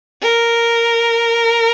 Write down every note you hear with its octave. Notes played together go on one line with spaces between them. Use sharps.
A#4